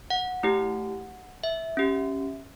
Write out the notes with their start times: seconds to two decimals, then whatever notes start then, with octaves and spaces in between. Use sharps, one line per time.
0.10 F#5
0.43 A3 E4 G4
1.43 E5
1.77 C#4 G4